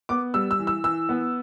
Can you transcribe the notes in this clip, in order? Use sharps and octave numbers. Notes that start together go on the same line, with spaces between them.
B3 D6
G3 E6
E6
E3
E6
E3 E6
B3